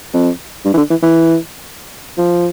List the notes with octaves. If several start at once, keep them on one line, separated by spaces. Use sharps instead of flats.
F2
G2
E3
D3
E3
E3
F3